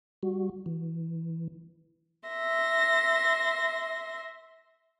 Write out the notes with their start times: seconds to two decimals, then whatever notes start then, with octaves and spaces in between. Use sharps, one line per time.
0.23 G3 F#4
0.66 E3
2.28 E5 C6 A#6